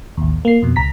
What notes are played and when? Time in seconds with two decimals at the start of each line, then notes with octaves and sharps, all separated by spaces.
0.17 A1 D#2
0.45 A#3 C7
0.63 F2 B2
0.76 C#2 A#5 B6